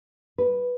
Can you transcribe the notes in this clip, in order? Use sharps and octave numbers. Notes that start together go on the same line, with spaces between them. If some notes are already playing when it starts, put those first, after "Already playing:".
B4